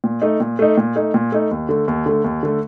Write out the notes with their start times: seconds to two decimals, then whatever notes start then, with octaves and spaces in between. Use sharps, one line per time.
0.04 A#2
0.22 A3 D#4
0.40 A#2
0.59 A3 D#4
0.77 A#2
0.96 A3 D#4
1.14 A#2
1.32 A3 D#4
1.51 D#2
1.69 D3 A3
1.88 D#2
2.06 D3 A3
2.24 D#2
2.43 D3 A3